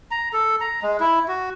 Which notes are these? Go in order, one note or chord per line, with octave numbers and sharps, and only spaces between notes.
A#5
A4
A#5
G#3
E4
F#4